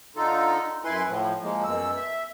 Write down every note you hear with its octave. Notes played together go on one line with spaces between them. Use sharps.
D3 D#4 F4 A4
F#2 E4 B4 G#5 C6
A2 F3
F3 G#3 A#3
F#2 B2 E6
E5